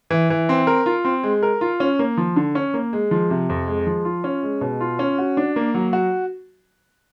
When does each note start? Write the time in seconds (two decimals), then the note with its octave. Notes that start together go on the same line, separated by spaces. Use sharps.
0.10 E3
0.30 E3
0.49 C4
0.67 A#4
0.86 F4
1.05 C4
1.23 G#3
1.43 A#4
1.61 F4
1.80 C#4
1.99 A#3
2.17 F3
2.36 D3
2.55 C#4
2.74 A#3
2.93 G#3
3.11 F3
3.30 C3
3.49 F2
3.68 G#3
3.87 F3
4.05 F4
4.24 C#4
4.43 G#3
4.61 B2
4.80 F4
4.99 C#4
5.18 F#4
5.37 D4
5.56 A#3
5.74 F#3
5.93 F#4